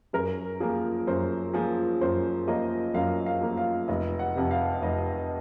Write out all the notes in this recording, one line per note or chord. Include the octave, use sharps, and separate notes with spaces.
F#2 A#4
F3 A#3 G#4
F#2 C5
F3 A#3 G#4
F#2 C5
F3 A#3 D#5
F#2 F5
F5
F3 A#3
F5
F1 D#5
F#5
F2 C3
F5
F1 D#5